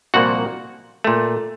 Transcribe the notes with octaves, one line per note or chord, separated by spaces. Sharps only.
C2 A#2 F3 A#3 F#4 F#5
A#2 A3